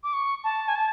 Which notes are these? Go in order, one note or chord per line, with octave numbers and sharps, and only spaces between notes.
D6
C#6
A5
G#5
A5